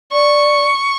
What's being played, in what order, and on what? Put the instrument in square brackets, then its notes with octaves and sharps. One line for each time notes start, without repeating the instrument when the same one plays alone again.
[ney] D5 [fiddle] C#6